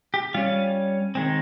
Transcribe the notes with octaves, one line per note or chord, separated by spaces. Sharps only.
G4
G3 C#4 F4
D#3 G#3 C4